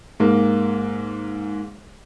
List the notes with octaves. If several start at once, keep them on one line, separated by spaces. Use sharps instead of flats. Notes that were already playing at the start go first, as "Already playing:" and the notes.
G#2 A#3